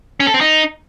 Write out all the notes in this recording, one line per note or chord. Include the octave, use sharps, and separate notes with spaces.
C#4
A4
C4
D#4